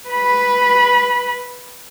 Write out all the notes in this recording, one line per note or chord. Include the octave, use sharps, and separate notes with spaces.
B4 B5